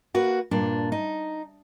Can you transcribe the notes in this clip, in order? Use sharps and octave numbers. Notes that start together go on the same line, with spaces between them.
A#3 F#4 B4
G2 A#2 D4
D#4